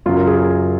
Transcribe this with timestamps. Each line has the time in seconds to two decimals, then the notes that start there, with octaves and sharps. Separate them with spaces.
0.06 F#2 C#3 F#3 F4
0.17 A#4
0.27 G#4
0.38 G#4